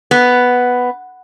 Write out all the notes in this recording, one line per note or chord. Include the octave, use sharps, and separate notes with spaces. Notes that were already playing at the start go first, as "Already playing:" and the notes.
B3